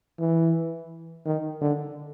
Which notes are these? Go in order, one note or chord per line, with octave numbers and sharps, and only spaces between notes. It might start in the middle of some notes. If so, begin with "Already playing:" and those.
E3
D#3
D3